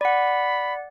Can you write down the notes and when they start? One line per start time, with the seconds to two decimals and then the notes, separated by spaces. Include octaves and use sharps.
0.01 D5 F#5 B5